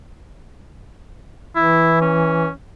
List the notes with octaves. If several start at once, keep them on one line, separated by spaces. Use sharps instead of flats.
E3 E4
C#4